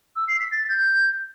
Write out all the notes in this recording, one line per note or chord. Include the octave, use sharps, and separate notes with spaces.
E6
C7
B6
A6
G6